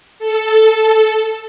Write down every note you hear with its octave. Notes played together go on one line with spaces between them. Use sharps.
A4